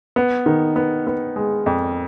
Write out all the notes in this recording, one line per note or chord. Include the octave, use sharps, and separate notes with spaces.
B3
D#3
B3
B3
G#3
F2